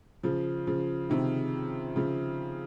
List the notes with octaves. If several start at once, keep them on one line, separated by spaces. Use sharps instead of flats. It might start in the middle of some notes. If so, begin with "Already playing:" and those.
C#3 F3
C#3 F3
C3 D#3
C#3 F3